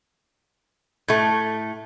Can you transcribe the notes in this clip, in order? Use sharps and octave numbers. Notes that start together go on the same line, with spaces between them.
A2 A3